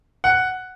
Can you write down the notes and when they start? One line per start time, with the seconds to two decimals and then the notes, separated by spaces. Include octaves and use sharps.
0.24 F#5